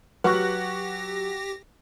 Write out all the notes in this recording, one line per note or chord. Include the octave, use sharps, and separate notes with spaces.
F#3 G4 B4 F#5 C#6 F#6 A#6